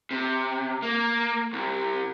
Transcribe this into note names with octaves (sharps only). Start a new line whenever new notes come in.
C3
A#3
C2